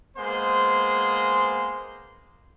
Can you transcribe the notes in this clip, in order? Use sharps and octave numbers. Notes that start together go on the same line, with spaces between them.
G#3 A#3 B3 C5 C6